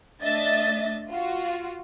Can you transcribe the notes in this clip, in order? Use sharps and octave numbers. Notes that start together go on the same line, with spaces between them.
A3 D4 D#5 E5 A6
F4 F#4